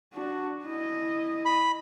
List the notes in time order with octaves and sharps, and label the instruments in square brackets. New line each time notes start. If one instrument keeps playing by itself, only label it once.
[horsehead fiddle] D4 F#4
E4 D#5
[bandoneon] B5